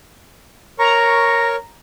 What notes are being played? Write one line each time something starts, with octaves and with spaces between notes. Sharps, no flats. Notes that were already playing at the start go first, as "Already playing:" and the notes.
A#4 C#5 A#5 C#6